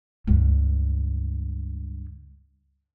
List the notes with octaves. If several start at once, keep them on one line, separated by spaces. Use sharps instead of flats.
C#2 G2